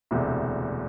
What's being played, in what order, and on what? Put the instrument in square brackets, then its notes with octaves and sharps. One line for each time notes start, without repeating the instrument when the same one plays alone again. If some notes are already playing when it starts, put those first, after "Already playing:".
[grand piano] E1 D2 C3